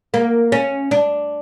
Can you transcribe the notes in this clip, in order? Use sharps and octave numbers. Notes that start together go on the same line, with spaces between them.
A#3
C#4
D4